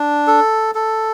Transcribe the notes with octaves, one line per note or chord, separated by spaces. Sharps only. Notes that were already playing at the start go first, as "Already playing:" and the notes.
Already playing: D4
A4
A4